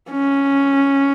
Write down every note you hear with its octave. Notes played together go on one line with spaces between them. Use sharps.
C#4